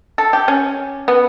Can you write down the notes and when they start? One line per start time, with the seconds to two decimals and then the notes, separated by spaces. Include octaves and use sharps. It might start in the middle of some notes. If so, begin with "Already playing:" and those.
0.18 A4
0.33 G4
0.48 C#4
1.08 B3